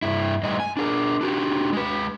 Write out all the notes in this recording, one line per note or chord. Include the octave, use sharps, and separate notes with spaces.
G2 E4
A2 G3 D#4 D#5
G#5
D4 G#4 A#4
D4 F#4 G4
G#3 B4